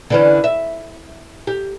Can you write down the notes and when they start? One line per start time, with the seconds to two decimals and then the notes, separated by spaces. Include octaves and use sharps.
0.10 D3 E3 C#4
0.44 E5
1.47 G4